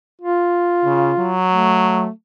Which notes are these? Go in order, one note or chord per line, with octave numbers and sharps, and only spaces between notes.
F4
C#3
F#3
A3